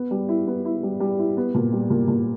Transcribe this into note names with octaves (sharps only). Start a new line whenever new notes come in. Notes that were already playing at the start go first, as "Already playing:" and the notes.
Already playing: B3
G3
E4
B3
E4
G3
G3
E4
B3
A#2
G3
A#2
A#2